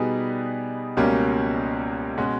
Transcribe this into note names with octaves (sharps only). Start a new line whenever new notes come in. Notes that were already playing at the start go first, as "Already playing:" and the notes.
Already playing: B2 G3 B3 D#4 G#4
C#2 B2 G3 A#3 C#4
B2 G#3 C#4 F#4